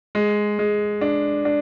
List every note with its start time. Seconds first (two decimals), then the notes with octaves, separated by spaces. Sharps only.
0.15 G#3
0.59 G#3
1.01 D4
1.45 D4